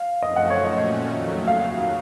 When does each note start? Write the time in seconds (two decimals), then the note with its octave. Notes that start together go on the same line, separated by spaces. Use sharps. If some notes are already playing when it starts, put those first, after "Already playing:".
Already playing: F5
0.23 F#2 F3 A3 C4 D#5
0.36 F#5
0.50 C#5
0.64 A#2 A3 C#4 F#4 D#5
1.06 F2 D#3 F#3 A3
1.47 D#2 C#3 F#3 F5